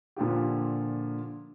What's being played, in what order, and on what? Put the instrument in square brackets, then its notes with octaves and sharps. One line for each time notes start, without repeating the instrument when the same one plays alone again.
[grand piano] A#2 D3 F3 G4